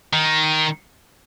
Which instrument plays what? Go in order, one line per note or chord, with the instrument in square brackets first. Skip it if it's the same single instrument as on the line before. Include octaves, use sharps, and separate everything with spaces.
[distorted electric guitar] D#3